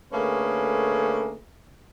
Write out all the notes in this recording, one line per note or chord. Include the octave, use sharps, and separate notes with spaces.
D3 A3 A#3 C#4 G#4 B4